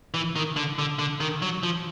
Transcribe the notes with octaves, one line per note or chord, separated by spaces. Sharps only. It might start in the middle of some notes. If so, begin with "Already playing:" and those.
E3
D#3
D3
D3
D3
D#3
F#3
F3